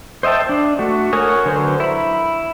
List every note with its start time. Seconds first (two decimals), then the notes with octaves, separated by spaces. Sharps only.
0.23 C5 D#5 E5 G5 A5
0.49 D4
0.79 A3 F#4
1.13 F#4 A#4 C#5 G#5 D#6
1.46 D3 F#3 B4 C5
1.80 E4 B5